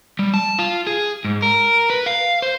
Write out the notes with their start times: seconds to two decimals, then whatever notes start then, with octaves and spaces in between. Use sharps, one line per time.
0.19 G3
0.34 A5
0.59 F4
0.87 G#4
1.25 G#2
1.42 A#4
1.90 B4
2.06 F5
2.42 C5